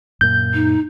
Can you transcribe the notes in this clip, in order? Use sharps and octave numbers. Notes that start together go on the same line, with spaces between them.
F#2 A#2 G6
D#4